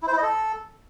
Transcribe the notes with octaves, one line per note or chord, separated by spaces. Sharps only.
E4
C5
E4
D#5
A4